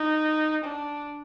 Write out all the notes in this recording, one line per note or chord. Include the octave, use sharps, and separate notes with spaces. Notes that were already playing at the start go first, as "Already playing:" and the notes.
Already playing: D#4
D4